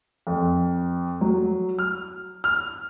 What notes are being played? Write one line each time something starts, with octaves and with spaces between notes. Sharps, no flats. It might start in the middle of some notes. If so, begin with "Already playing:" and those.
F2
F#3
F6
F6